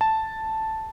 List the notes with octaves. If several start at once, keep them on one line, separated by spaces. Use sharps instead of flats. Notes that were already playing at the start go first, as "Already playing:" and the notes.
A5